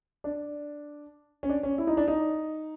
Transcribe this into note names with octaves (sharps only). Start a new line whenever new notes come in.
D4
C#4
D4
C#4
E4
D#4
D4
D#4